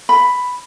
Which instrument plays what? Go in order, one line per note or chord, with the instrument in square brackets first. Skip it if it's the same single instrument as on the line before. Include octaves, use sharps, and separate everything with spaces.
[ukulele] B5